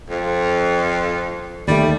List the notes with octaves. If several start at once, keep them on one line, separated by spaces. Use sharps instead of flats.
F2
D#2 D#3 G3 A3